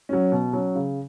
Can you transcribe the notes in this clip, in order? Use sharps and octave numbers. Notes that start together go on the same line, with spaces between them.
F#3 C#4
B2
F#3 C#4
C#3